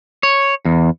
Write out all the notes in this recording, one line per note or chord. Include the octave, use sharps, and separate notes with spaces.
C#5
E2